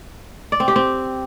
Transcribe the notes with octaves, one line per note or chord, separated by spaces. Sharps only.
D5
C4
G4
C4